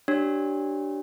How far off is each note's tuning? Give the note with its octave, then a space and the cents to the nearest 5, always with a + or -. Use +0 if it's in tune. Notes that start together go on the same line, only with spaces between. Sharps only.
D4 +0 G4 -30 C#5 +0